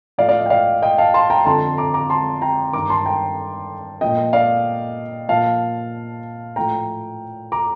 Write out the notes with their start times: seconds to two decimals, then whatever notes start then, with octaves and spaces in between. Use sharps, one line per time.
0.18 A2 F3 D5 F5
0.29 D5 F5
0.40 D#5
0.46 G5
0.50 D5 F5
0.82 D#5 G5
0.98 F5 A5
1.14 A5 C6
1.30 G5 A#5
1.46 F2 D3 F3 A5 C6
1.78 A#5 D6
1.94 A#5 D6
2.10 A5 C6
2.42 G5 A#5
2.73 G2 D#3 A#5 D6
2.90 A5 C6
3.05 G5 A#5
4.01 A#2 F3 D#5 G5
4.33 D5 F5
5.29 A#2 F3 F5 A5
6.56 A2 F3 G5 A#5
7.52 A#5 D6